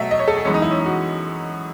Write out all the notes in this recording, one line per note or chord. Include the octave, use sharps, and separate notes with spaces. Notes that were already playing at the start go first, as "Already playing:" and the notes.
Already playing: B2 F#3 A3 E5
D#5
C#5
A4
G#4
F#2 E3 G#3 B3 C#4
D#4
E4
C#4
D#4
F#4